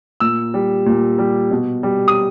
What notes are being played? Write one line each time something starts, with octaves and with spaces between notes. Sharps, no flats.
A#2 E6
G3
A#2
G3
B2
G3
D#6